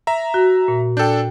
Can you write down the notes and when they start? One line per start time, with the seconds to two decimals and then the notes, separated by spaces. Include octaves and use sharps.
0.07 E5 A#5
0.34 F#4
0.68 A#2
0.97 D4 A4 G5 G6